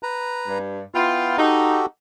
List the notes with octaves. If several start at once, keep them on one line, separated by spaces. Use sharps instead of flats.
B4 A#5
G2
B3 E4 F4 G5
D#4 F#4 G4 A4